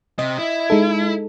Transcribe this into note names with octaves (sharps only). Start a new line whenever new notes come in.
C3 D#5
E4
G#3 D#4 A4